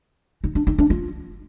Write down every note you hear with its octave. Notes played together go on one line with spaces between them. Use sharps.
D#4
D4
D#4
D4
F4